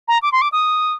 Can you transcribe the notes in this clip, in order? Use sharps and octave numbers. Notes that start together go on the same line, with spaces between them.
A#5
D6
C6
D6
D#6